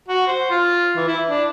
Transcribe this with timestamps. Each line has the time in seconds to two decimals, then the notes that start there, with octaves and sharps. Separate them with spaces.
0.08 F#4
0.27 C5
0.50 F4
0.96 E3
1.08 E4
1.28 D4